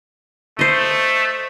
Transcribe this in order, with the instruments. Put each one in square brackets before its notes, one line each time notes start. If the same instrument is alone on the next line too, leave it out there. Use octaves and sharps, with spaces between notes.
[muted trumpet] A3 [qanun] C5 D#5